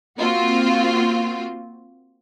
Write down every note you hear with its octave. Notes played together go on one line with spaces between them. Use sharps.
A#3 C4 F4 F#4